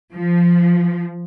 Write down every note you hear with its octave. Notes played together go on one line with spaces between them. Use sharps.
F3